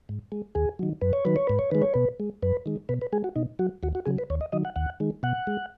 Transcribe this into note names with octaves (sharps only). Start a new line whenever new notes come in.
G#2
G#3
D#2 G#4
D#3 F#3
F#2 B4
C#5
D#3 F#3 B4
C#5
G#2 B4
C#5
D#3 G#3 B4
C#5
B2 B4
G#3
F#2 B4
D#3 G#3
B2 B4
B4
G#3 G#4
F#4
B2 D#4
F#3 F#4
D#2 F#4
F#4
C#3 F#3 G#4
B4
D#2 C#5
D#5
D#3 F#3 D#5
F#5
D#2 F#5
D#3 G#3
B2 F#5
G#3